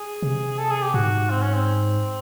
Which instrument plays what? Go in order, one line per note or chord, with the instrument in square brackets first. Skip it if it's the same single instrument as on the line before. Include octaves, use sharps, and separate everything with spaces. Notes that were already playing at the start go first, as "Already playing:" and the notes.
Already playing: [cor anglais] G#4
[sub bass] C3
[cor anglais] A4
G#4
G4
[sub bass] G#2 [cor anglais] F#4
[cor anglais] C4
C#4
C4